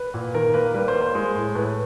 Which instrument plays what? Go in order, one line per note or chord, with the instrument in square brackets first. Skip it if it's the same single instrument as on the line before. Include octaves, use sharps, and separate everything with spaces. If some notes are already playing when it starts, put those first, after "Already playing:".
Already playing: [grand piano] B4
A#2
D#3 A#4
A#3 B4
G3 B4
C5
A#3
C5
G#3
A2
A2 B4